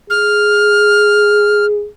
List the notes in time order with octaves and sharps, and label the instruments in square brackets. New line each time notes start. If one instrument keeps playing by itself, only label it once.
[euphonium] G#4 [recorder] F6